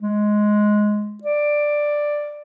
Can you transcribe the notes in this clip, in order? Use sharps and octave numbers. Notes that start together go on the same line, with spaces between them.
G#3
D5